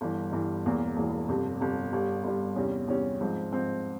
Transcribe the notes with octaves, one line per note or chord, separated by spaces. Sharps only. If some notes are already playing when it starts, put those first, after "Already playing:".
G1 G2 E3 G3
G1 G2 E3 G3
E1 E2 E3 A#3
E1 E2 E3 A#3
G1 F2 C3
G1 F2 C3
G1 G2 G3
G1 G2 G3
E2 C3 G3 C#4
E2 C3 G3 C#4
G#2 F3 C4
G#2 F3 C4